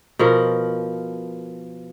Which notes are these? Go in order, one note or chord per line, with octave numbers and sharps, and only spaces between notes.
B2 F3 A#4